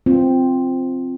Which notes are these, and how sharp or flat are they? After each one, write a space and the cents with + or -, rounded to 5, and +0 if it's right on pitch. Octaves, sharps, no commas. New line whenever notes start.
C4 +0 F4 +0